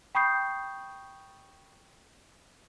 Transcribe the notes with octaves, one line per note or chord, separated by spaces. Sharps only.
G5 B5 C#6 D#6 G6 C7